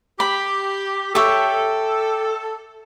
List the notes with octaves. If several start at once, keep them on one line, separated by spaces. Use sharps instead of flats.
G4 B5
G4 A4 C#5 E5